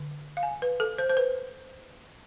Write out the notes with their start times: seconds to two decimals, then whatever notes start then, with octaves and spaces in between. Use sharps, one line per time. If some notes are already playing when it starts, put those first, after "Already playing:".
Already playing: D3
0.37 F5
0.43 G#5
0.62 B4
0.80 A4
0.98 C5
1.09 C5
1.17 B4